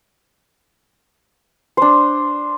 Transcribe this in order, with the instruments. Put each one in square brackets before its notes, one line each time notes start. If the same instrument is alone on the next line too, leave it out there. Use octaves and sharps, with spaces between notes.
[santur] D4 C5